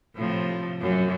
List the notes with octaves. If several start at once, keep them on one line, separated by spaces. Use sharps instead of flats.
A2 C3 F3
F#2 F#3